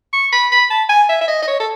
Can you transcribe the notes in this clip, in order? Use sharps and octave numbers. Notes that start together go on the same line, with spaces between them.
C#6
B5
B5
A5
G#5
E5
E5
D#5
D#5
C#5
A4